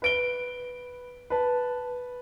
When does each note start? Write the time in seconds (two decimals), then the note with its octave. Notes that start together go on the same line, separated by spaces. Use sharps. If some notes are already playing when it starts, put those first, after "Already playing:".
0.02 B4 D7 G7
1.30 B4 A5